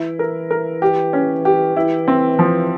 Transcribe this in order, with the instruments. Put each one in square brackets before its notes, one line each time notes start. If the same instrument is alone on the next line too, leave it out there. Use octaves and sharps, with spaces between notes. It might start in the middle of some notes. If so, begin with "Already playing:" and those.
Already playing: [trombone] E3 [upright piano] E4
[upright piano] A#4
A#4
G4
C#4
G4
[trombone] E3 [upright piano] E4
[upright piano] C4
F3